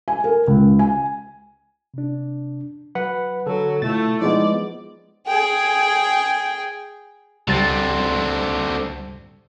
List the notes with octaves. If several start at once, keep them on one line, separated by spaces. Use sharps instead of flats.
G#5
A#4
C#2
G#5
C3 D4
F#3 B4 F#5 B5
D3 F#3 A4
B2 A3 E4 F4 A6
F3 G#3 B3 D#4 E4 D5
G#4 G5
C#2 D3 G3 C4 A6